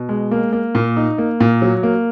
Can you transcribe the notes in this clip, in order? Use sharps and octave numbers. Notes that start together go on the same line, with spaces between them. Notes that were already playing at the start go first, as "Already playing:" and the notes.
Already playing: B2
G#3
A#3
A#3
A#2
D#4
A#3
A#2
F#3
A#3